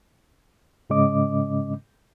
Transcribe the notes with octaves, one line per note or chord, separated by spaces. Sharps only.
G#2 C#3 G#3 C#4 D#5 D6